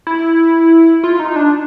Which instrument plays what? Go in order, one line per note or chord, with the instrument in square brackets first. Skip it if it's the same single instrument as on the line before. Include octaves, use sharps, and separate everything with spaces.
[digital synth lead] E4
F4
D#4
D4